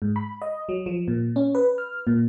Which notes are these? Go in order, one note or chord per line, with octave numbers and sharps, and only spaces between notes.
G#2
B5
D#5
F#3
F3
A#2
C#4
B4
F6
A#2